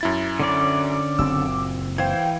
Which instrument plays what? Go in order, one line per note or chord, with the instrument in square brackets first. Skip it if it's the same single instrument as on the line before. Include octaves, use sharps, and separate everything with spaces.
[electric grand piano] F#2 E4 A6
[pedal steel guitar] D3 C#4 D5 [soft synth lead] D6
[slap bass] F#1 A#2 C4 [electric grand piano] E6
[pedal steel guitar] E3 F5 [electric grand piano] C5 G#6 [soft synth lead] G5